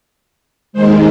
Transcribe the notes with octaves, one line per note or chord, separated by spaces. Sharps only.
D#2 D#3 G#3 C5